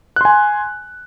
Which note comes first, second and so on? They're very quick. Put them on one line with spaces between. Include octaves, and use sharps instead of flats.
F#6 C6 G#5